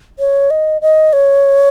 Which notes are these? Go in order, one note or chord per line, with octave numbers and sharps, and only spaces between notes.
C#5
D#5
D#5
C#5